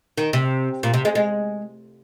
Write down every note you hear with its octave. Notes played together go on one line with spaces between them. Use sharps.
D#3
C3
A#2
C3
G#3
G#3